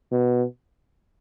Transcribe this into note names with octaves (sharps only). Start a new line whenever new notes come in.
B2